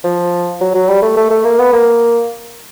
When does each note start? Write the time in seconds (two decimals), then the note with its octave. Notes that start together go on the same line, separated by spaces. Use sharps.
0.04 F3
0.61 F#3
0.74 F#3
0.89 G3
1.02 A3
1.17 A3
1.30 A3
1.44 A#3
1.59 B3
1.73 A#3